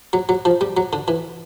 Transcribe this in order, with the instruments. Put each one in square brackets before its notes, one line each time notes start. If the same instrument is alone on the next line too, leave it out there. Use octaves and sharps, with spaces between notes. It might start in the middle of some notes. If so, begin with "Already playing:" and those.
[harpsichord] F#3
F#3
F3
G3
F#3
D3
E3